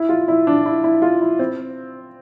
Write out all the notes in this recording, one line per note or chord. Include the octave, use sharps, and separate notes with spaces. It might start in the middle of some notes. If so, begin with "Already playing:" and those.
Already playing: E4
F4
E4
D4
E4
E4
F4
E4
C4